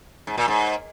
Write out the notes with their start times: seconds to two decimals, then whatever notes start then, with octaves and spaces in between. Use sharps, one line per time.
0.27 G#2
0.38 A#2
0.48 G#2